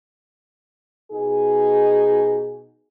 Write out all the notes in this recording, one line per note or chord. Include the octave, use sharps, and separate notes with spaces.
B2 D#4 G#4